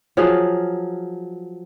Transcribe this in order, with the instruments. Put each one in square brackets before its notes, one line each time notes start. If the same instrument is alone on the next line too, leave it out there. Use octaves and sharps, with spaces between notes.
[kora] F3 F#3 G#4 F5